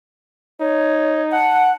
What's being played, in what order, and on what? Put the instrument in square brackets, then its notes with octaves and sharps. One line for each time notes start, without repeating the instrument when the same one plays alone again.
[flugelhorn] D#4 [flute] C#5
[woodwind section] F#5 [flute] A5